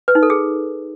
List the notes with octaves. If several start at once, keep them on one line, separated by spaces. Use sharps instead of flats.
B4
D#4
A4
G#4